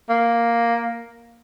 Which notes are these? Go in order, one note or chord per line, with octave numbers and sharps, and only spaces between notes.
A#3